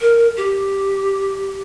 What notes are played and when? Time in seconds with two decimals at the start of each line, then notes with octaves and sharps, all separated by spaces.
0.01 A#4
0.37 G4